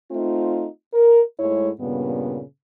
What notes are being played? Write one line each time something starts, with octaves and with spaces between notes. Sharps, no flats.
A3 C4 D#4 F4
A#4
G#2 G#3 A3 E4 C#5
G2 A#2 C#3 B3